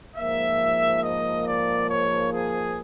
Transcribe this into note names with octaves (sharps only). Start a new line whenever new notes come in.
G#2 F3 A#3 E5
D#5
D5
C#5
G#4